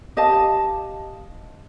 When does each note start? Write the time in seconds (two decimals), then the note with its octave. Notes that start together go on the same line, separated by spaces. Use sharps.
0.17 G4 D#5 F5 A5